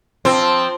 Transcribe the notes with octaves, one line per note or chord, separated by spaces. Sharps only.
F3 C4